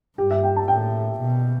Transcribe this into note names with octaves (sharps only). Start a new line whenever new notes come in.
G2 G4
E5
G5
A5
A2 G5
B2